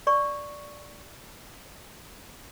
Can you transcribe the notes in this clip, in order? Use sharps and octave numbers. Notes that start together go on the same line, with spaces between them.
D5 C#6